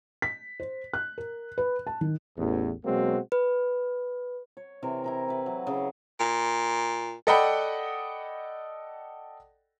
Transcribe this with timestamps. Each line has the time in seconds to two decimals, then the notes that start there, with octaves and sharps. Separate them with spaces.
0.22 B6
0.60 C5
0.94 F#6
1.18 A#4
1.58 B4
1.87 A5
2.01 D#3
2.38 A1 E2
2.85 B2 F#3 G#3 A#3 C4 F#4
3.32 B4
4.57 C#5
4.83 C3 E3 A#4
5.04 E4 A#4 A#5
5.28 G4 B4
5.46 F#3
5.67 C#3
6.20 A#2
7.27 A4 D5 D#5 F#5 G5 B5